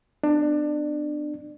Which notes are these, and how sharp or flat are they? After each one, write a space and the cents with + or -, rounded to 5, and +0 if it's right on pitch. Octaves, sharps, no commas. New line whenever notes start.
B3 +35 D4 +25